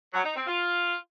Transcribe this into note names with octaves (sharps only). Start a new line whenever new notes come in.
F#3
D#4
C4
F4